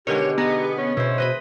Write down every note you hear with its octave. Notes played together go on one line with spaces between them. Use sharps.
B2 D3 D#3 G#3 G4 C#5
B3 D#4 G#4
C#4
B2 E4 C5
B4 C5 D#5 B5